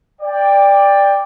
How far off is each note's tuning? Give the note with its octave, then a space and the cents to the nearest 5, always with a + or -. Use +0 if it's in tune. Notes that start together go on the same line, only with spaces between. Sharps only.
D5 +0 G5 +20